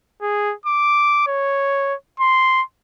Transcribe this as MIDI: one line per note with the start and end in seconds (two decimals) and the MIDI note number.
0.22 0.54 68
0.66 1.23 86
1.27 1.95 73
2.20 2.62 84